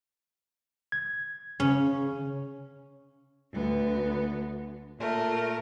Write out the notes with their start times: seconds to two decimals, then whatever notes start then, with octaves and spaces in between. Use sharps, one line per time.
0.92 G#6
1.60 C#3 C#4
3.52 D2 B3
4.98 A#2 A3 A#4